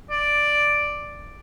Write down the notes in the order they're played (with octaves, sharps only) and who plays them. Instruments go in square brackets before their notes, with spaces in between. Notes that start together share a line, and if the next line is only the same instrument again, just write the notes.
[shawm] D5